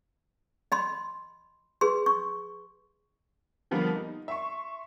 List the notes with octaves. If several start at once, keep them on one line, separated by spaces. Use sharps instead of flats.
D#5 B5 C6
G#4 B4 C6
C#6
D3 F3 G3 A#3 B3
D#4
E5 C6 C#6